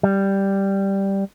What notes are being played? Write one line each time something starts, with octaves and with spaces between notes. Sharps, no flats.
G3